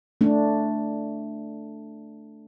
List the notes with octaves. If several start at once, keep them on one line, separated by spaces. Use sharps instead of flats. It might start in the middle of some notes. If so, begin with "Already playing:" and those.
A3 D4